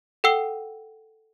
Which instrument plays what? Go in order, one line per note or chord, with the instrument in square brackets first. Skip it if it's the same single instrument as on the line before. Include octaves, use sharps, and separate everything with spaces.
[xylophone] A4 F#5 G5 E6 C7 G7